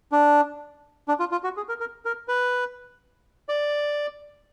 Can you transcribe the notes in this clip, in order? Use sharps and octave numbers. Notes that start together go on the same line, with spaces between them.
D4
D4
F4
F4
F#4
G#4
A#4
A#4
A#4
B4
D5